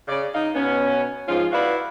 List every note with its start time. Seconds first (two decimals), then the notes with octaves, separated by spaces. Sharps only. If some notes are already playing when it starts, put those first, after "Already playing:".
0.08 C#3 D5
0.35 D#4 F5
0.55 B2 B3 C#4
1.28 G#2 F3 C#4 F4
1.52 E4 F#4 B4 D5 F5